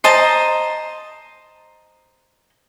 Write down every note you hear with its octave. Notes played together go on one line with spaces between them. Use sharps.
C5 D#5 A5 A#5